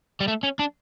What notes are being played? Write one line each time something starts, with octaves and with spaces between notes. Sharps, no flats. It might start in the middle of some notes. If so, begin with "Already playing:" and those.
G3
A3
C#4
D4